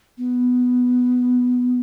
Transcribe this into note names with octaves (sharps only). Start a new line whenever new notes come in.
B3